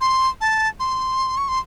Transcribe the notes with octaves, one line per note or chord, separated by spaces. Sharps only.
C6
A5
C6
C#6
C6